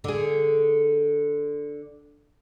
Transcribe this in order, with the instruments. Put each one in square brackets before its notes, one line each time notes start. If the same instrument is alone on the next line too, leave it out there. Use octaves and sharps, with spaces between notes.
[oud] D3 G#4